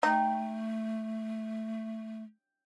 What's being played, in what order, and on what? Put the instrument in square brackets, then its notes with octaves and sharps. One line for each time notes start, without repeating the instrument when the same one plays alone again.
[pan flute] A3 [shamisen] D#4 [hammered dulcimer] G5